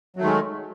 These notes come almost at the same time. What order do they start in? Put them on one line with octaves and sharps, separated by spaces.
F#3 A3 D#3 G#3